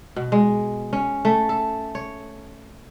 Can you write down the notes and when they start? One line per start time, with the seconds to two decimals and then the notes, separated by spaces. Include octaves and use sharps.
0.16 B2
0.32 G#3
0.93 C#4
1.25 A3
1.49 A4
1.95 C#5